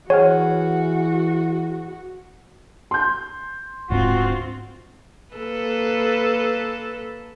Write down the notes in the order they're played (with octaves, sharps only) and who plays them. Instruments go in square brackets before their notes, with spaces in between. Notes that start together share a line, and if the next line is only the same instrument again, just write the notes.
[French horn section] E3 [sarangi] F#4 [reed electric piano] G#4 F#5 F6 [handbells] C#5
[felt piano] C6 G6
[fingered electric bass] D1 G#2 D4 [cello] C4 F4 [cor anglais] F#4
[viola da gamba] A#3 A4 B4